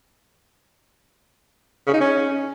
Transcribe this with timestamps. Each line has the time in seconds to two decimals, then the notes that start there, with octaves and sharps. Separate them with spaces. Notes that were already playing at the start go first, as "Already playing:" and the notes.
1.87 C#3
1.94 D#4
2.01 C#4